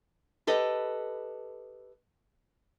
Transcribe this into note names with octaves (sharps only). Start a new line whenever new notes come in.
G4 A4 B4 D#5